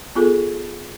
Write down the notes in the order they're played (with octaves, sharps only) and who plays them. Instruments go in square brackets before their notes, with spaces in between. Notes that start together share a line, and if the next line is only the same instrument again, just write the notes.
[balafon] B3 F4 G#4 A4